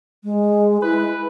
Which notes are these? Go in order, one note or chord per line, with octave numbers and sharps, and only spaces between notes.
G#3
E4 B4